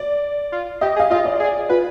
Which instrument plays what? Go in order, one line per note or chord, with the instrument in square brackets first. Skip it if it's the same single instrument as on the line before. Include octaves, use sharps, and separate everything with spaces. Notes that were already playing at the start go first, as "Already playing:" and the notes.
Already playing: [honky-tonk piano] D5
[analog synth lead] F4
[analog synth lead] G4 [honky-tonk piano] D#5
[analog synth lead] G#4
[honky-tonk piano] F5
[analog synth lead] F4 [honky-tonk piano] D#5
[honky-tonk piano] D5
[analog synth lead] G#4
[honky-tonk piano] F4 [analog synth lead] B4